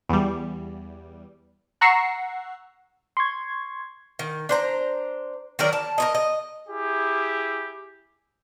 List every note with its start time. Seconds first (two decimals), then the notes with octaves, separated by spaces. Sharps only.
0.09 E2 G3
1.81 F#5 A#5 C#6 E6 C7
3.17 C6 C#6 G#6
4.19 D#3
4.49 D4 C5 A#5
5.59 D#3 F#3 A#4 D5
5.73 A5
5.98 A#4 C#5 D#5
6.15 D#5
6.68 E4 G4 G#4